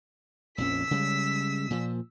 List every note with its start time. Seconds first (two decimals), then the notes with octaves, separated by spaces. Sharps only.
0.58 A#1 F2 C#4 E6 B6
0.91 C#3 G3 G#3
1.70 A#2 F3